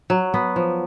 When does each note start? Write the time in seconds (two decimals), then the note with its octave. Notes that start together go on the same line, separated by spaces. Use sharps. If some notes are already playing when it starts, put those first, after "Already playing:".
0.10 F#3
0.34 B3
0.56 F3